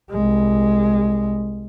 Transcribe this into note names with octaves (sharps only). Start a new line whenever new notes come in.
C2 G#3